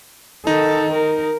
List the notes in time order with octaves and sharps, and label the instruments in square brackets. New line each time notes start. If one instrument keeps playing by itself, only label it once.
[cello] D#3 A4 [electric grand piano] D#4
[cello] A#4